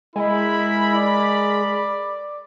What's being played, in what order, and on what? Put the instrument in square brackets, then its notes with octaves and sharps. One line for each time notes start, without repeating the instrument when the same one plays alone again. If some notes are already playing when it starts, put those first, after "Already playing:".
[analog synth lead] G#3 [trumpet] E4 [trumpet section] A#4 B5
[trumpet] D5